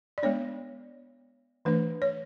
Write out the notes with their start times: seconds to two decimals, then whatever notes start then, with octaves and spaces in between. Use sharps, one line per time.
0.18 D5
0.23 G#3 B3 D4 C#5
1.65 E3 A3 D4 B4
2.02 C#5